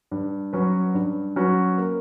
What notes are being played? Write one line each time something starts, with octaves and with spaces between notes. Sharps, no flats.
G2
F#3 C#4 F#4 B4
G2
F#3 C#4 F#4 B4
A#3